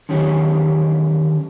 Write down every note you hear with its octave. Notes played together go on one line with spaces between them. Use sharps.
D3 D#3 F#3 C#4 G4 C#5